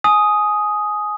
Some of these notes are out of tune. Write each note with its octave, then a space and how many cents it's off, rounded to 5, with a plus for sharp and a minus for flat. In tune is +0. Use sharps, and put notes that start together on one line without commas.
G#5 +20 D#6 +5